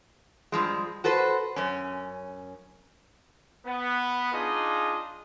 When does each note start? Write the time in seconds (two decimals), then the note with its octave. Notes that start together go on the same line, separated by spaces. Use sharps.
0.52 G2 F3 G#3
1.04 F#4 A4 B4 C5
1.56 F#2 C#4
3.65 B3
4.33 D4 D#4 F4 G#4 D#5